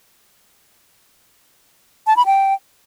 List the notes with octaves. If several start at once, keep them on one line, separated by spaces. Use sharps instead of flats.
A5
B5
G5